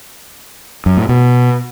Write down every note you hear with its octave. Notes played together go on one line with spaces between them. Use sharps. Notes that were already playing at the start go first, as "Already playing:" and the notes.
F#2
A2
B2